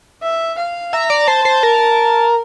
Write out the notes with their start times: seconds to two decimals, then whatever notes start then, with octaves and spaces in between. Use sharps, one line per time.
0.22 E5
0.58 F5
0.93 E5 A#5
1.10 D5
1.27 C5 A5
1.45 C5
1.63 A#4